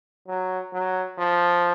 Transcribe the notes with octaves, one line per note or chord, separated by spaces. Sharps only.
F#3
F#3
F3